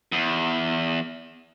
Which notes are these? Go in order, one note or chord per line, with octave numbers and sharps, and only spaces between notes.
E2